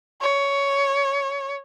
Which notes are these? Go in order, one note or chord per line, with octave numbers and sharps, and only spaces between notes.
C#5